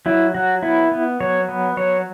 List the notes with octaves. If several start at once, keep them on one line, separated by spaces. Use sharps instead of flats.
F#3 E4
F#3 F#4
B3 E4
B3
F#3 C#5
B3
F#3 C#5